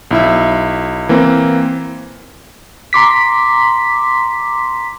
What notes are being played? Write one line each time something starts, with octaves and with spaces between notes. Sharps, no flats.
B1 E4 E5
E3 A#3 C4
A#5 C6 D6 B6